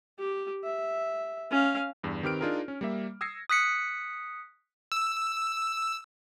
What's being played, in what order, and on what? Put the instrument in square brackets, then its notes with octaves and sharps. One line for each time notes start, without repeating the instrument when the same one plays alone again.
[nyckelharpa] G4
E5
C#4 F5
[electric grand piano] E2 G2
D#3 C4 G4 B4 F6 D7
D4 D#4 F4 G#4 A#4
C#4
G3 A#3 E5
D#6 E6 G#6 A#6 C7 C#7
[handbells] D#6 F#6 B6 C#7
[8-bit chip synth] E6